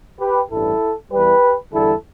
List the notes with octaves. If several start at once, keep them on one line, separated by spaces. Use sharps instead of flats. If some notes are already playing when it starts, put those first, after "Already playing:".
G4 B4
A1 G2 G3 E4 A4
E2 E3 G3 G4 B4
E2 D3 G3 E4 A4